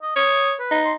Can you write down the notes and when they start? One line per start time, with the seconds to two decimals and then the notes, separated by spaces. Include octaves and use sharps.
0.02 D#5
0.16 C#5 D#6
0.59 B4
0.71 D#4
0.85 C6